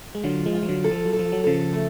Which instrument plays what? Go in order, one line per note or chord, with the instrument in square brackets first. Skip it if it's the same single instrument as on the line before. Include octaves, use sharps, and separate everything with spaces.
[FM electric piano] G#3
[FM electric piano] D3 F#3 [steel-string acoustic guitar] F4
[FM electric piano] F3 G#3
[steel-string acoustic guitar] F4
[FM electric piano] F3
D3 F#3
[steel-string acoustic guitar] A4
[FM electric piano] F3
F#3
[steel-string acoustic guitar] A4
[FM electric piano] F3
F#3
[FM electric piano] C#3 F3 [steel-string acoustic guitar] A4
[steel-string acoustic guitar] A3